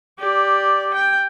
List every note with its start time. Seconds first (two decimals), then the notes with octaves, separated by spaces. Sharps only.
0.19 G4 D5
0.94 G5